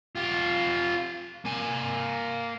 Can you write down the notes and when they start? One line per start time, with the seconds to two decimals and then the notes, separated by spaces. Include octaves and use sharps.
0.15 F4 G4
1.45 A#3 G#5